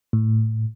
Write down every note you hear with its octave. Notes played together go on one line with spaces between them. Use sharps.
A2